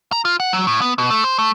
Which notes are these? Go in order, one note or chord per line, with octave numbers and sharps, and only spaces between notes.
A#5
F4
F#5
F#3
A2
B3
B2
A3
C5
A3